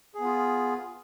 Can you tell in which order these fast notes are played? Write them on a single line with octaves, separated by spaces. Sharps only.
G#4 B3 F4